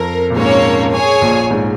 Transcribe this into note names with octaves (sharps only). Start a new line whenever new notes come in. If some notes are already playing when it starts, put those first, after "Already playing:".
Already playing: F2 A#4
A#2
G#2 A#3 C#4 A#4 C#5
G#4 C#5 G#5
A#1 A#2
G#2